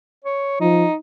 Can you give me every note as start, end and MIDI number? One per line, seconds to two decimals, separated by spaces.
0.25 0.56 73
0.60 0.85 53
0.60 0.95 63